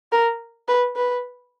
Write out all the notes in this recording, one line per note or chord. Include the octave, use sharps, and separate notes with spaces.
A#4
B4
B4